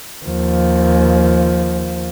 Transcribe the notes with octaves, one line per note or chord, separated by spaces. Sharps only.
D#2 F3